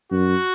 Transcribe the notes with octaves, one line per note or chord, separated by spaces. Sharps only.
F#2 F#4